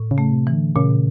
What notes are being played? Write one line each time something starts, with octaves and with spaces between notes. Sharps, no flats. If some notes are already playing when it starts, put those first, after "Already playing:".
Already playing: A2
C#3
A3
C3
E3
D3
A#2 C#3